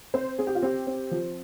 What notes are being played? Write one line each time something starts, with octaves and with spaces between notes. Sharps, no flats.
C4 C5
C4 G#4
G4
F4
C4 G4
C4
F3